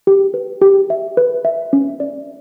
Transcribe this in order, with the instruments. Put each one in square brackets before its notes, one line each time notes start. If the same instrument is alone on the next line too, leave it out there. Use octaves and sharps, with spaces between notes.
[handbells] G4
B4
G4
E5
B4
E5
C#4
D5